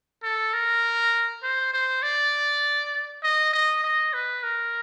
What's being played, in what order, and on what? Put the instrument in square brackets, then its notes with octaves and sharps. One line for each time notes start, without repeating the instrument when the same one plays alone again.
[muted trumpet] A4
A#4
C5
C5
D5
D#5
D#5
D#5
B4
A#4